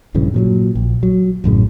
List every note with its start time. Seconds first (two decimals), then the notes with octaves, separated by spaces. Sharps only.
0.14 A#1 G2 C#3 E3
0.34 A#2 F3 F#3
0.75 A#1
1.03 F#3
1.44 A1 F#2 A2 C#3